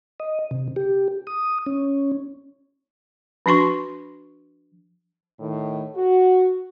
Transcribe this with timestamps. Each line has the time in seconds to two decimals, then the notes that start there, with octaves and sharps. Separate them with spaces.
0.20 D#5
0.51 C3
0.76 G4
1.27 D#6
1.66 C#4
3.46 F3 D4 F#4 C6 C#6
5.40 A2 D#3
5.95 F#4